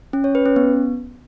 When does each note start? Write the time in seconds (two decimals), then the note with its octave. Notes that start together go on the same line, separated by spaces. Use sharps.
0.13 C#4
0.24 C#5
0.35 B4
0.46 C#4
0.56 B3